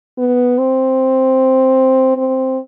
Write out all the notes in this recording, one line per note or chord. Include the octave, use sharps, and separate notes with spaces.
B3
C4
C4